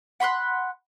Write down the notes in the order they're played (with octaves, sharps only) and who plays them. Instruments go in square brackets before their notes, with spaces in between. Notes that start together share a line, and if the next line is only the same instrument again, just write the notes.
[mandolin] F#5 B5 C6 F#6